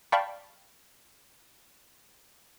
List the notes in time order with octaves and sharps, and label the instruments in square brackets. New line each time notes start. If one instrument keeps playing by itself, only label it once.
[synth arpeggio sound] D5 F5 G5 A5 B5 C#6